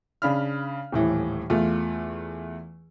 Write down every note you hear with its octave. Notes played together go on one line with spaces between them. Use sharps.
C#3 D4 B5 F6
D#1 A2 E3
E2 A3 F4